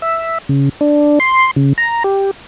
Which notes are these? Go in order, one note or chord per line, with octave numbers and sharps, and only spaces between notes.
E5
C#3
D4
C6
C#3
A#5
G4